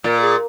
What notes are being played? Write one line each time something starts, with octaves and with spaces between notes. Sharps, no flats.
A#2 A#4
G#4